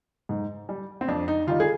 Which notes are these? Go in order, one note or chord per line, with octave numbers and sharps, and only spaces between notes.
G#2
G3
C4
F2 D4
D#4
D#3 G3 F4
G#4